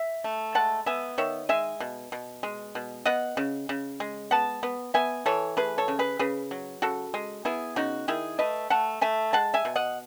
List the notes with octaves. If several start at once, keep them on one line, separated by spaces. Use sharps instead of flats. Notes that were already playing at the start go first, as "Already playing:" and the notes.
Already playing: E5
A3
G#3 F#5 A5
B3 E5 G#5
D#3 C#5 E5
G#3 E5 G#5
B2
B2
G#3
B2
B3 D#5 F#5
C#3
C#3
G#3
B3 F#5 A5
B3
B3 E5 G#5
E3 A4 C#5
A3 G#4 B4
A4 C#5
C#3
G#4 B4
C#3 G#4 B4
F#3
C#3 F#4 A4
G#3
B3 E4 G#4
C#3 D#4 F#4
D#3 E4 G#4
A3 B4 D#5
A3 F#5 A5
A3 E5 G#5
G#3 F#5 A5
E5 G#5
B2
D#5 F#5